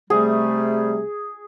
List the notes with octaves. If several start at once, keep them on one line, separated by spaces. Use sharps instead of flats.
C3 G3 A3 G#4